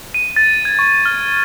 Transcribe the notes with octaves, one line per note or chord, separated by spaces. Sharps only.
D#7
A6
G#6
C#6
F6